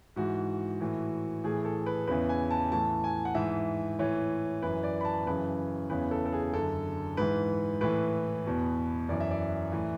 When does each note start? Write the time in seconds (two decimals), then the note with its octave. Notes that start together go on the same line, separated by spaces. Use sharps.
0.16 G#2 E3 F#4
0.80 A2 E3
1.44 A2 E3 G#4
1.65 A4
1.86 B4
2.07 E2 C#3 E3 B4
2.29 G#5
2.51 A5
2.71 A2 E3 A5
3.04 G#5
3.25 F#5
3.35 G#2 E3 E5
3.99 A2 E3 C#5
4.62 F#2 E3 B4
4.83 D5
5.01 B5
5.05 A5
5.26 F#2 C#3 E3 B4
5.90 E2 C#3 E3 B4
6.11 A4
6.25 A4
6.33 G#4
6.53 F#2 D3 A4
7.17 G#2 E3 B4
7.81 A2 E3 B4
8.46 E2 B2
9.09 F#2 E3 D5
9.20 E5
9.31 D5
9.72 A2 E3